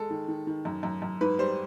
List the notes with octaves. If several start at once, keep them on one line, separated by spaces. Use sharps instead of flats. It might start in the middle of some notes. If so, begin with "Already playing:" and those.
Already playing: G#3 A4
D#3
D#3
D#3
F#2
F#2
F#2
G#2 B4
G3 C5